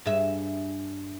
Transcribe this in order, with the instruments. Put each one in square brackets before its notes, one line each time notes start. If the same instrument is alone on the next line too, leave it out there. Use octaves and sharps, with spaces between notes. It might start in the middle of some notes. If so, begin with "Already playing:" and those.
[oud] G2 G#4 E5